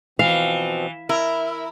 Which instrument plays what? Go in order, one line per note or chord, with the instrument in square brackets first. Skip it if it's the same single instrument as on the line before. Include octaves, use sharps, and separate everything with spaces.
[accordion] B2 F3 C4 [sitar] E3 [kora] F5
[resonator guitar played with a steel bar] E4 [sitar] A#4 [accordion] E5